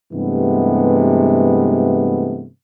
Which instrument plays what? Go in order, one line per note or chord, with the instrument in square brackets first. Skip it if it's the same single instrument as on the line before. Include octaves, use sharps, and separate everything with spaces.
[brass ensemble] G2 C3 E3 G#3 A3 B3